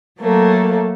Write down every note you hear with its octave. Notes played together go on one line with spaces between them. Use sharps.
F#3 A3 A#3